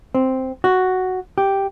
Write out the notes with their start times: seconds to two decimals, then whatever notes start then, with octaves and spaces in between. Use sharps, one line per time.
0.15 C4
0.64 F#4
1.38 G4